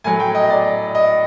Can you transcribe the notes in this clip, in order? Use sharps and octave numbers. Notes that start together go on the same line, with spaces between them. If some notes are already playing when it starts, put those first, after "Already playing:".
A2 F#3 A3 G#5
G5
D#5
D5
D#5